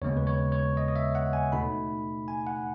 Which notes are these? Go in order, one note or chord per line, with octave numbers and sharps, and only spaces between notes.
D#2 C#3 G#3 B3 C#5
B4
C#5
C#5
D#5
D#5
E5
F#5
G#5
B2 A3 D#4 B5
G#5
F#5